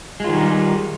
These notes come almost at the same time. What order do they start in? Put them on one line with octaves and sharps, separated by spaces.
G#3 F4 D#3 G3 D#4